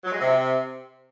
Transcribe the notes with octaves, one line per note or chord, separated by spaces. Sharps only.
F#3
G#3
C3